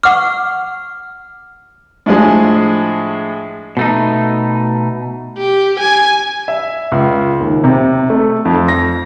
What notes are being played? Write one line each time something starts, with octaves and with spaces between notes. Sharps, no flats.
F#5 C#6 D6 F6
A2 F3 G#3 D4 G#4
B2 A3 D#4
G4
G#5
E5
C#2
D#2
C3
A3
F2
A#6